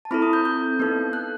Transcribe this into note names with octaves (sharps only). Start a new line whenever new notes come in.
A5
C4 E4 A4 B5
D#6
G6
G6
B3 D#4 A4
F#6